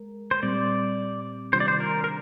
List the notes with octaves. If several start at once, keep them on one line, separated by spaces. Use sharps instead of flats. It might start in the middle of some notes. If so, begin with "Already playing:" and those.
Already playing: G#3 A#4
C5
A#2 G3 C4 D5
C3 D#3 G3 D4 F4 C5
D5
C5
A#4
A#4